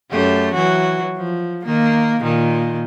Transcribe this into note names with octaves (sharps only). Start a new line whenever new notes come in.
F#2 A3 G4
E3 F#3 F#4
F3
D#3 A#3
A#2 D#3